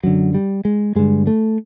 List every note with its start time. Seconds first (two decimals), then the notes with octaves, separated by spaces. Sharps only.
0.03 F#2 D3 F#3
0.34 G3
0.65 G#3
0.95 G2 D3 G#3
1.27 A3